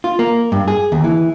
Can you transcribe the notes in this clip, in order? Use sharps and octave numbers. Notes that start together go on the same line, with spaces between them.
F4
A#3
G2
G#4
D#2
E3